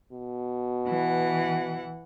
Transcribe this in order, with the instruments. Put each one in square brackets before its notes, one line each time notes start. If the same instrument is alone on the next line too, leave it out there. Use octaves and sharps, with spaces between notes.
[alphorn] B2
[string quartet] E3 F#5